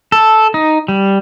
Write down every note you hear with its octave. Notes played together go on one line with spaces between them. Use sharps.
A4
D#4
G3